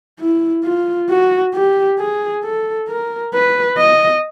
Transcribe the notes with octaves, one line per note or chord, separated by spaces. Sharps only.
E4
F4
F#4
G4
G#4
A4
A#4
B4
D#5